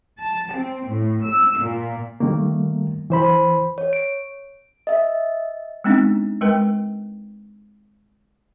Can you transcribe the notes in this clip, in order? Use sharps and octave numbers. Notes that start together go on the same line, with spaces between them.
A5
C4
A2
E6
A#2
D#3 G3 A3 A#3
E3 C5 B5
C#5
D7
D#5 E5
G#3 B3 C4 D4 D#4
G#3 A#4 B4 G5